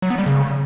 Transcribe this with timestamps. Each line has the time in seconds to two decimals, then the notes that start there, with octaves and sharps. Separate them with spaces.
0.02 F#3
0.10 B3
0.18 G3
0.26 C#3